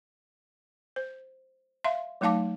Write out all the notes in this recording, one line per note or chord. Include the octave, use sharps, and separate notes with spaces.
C5
E5 F5 C6
F#3 A3 D#4 F5 A5 D6